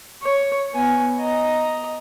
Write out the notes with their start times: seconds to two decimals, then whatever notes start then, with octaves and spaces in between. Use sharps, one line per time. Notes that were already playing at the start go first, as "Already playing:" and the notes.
0.22 C#5
0.74 B3 G#5
1.19 D#5 A#5